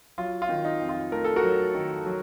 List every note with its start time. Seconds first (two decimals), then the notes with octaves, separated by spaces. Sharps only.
0.18 F#3 F4
0.42 F4
0.49 D#3
0.65 D#4
0.80 F2
0.89 F4
1.12 A3 A#4
1.24 A4
1.36 F#4 A#4
1.44 F#3
1.74 D#3
2.06 F#3